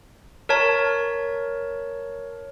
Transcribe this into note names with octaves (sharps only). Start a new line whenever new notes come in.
A#4 C#5 A5